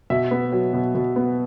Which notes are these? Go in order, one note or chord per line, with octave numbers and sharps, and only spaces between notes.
B2 E5
B3
F#3
B2
B2
B3